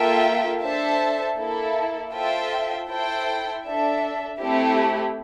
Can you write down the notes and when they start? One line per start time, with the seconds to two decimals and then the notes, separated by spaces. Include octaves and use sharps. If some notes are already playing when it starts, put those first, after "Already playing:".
Already playing: A#3 F4 A4 E5 G5
0.62 D4 A4 C5 E5 A5
1.38 A#3 E4 A4
2.13 F4 A4 C5 E5 G5
2.88 E4 A4 C5 G5
3.65 D4 A4 E5
4.41 A3 C4 E4 G4